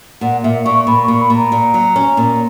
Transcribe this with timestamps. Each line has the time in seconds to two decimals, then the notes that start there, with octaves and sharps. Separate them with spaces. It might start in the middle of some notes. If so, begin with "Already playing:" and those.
0.21 A#2 F#5
0.44 A#2 E5
0.65 A#2 C#6
0.87 A#2 B5
1.03 A#2 C#6
1.20 B5
1.30 A#2
1.36 A#5
1.52 A#2
1.74 F#3
1.96 C#4
2.17 A#2